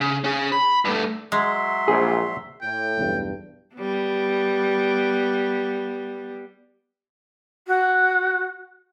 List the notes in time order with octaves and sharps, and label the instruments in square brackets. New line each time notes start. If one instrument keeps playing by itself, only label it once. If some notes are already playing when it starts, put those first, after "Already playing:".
[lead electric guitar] C#3
C#4 G#4
B5
G2 A3
[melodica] F#3 E5 C6 [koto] G#3
[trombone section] A#1 [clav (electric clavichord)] G#4
[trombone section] A2 [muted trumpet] G5
[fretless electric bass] B1 E2 G2
[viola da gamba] G3 B3
[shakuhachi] F#4